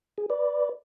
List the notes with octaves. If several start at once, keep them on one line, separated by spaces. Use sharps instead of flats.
G#4
B4 D5